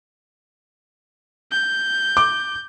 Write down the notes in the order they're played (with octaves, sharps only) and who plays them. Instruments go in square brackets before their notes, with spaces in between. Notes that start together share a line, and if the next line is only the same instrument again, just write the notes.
[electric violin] G6
[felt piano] D6